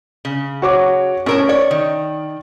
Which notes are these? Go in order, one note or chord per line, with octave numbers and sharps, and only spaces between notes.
C#3
F#4 C#5 D6
A2 C#4 A#4 A5
C#5 D5
D#3